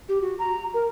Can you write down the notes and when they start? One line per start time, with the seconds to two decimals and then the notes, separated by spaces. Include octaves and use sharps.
0.09 G4
0.21 F#4
0.39 A#5
0.74 A#4